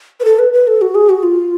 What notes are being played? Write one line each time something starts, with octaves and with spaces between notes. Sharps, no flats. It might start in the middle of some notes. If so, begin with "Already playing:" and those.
B4
A4
B4
B4
A4
F#4
G#4
F#4
F4